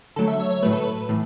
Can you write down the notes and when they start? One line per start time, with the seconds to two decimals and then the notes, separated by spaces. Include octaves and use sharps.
0.16 D3 F#3 A3 A4
0.28 E5
0.40 C#5
0.51 C#5
0.63 A2 F#3 A3 B4
0.73 A4
0.84 B4
1.09 A2 E3 A3